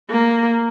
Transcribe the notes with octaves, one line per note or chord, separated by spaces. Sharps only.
A#3